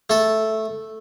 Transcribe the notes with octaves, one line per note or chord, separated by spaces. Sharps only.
A3 A4